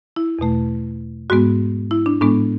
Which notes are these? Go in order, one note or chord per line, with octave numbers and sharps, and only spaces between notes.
E4
E2 B2 A3
G#2 G#3 B3 F#4
E4
D4
A2 G#3 B3 D4